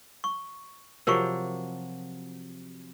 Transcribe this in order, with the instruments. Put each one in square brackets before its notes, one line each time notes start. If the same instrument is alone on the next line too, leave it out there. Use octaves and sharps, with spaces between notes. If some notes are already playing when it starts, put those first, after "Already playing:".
[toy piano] C#6
[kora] C3 F3 F#3 [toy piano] A#4 C#6